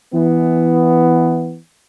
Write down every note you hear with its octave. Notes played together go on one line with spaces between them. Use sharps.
E3 B3